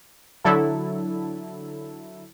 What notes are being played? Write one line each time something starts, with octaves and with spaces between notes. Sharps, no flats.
D3 F#3 E4 A4